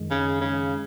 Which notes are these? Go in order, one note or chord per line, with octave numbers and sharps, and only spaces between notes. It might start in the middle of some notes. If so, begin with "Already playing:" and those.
Already playing: F#2 D#3 G#3
C#3
C#3